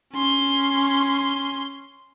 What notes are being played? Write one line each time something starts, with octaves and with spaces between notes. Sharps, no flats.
C#4 C6